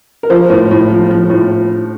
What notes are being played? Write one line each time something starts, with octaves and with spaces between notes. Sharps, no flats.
A#4
F3 C5
A2
A2
F3
F3
A2